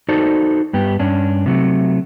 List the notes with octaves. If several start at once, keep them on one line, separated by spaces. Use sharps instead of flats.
D#4 F#4 A4 C5 D5
G2 B3 G4
G2 C#4 D4
C3 F#3 A3